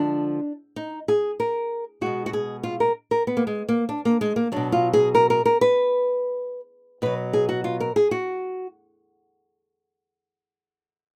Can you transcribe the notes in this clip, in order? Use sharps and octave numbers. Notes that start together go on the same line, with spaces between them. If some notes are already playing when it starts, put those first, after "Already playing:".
Already playing: D3 F3 G#3 D4
D#4
G#4
A#4
B2 G#3 F#4
F#4
G#4
F4
A#4
A#4
B3
A#3
G#3
A#3
D4
A#3
G#3
A#3
B2 F#3 D4
F4
G#4
A#4
A#4
A#4
B4
B2 F#3 B4
G#4
F#4
F4
A#4
G#4
F#4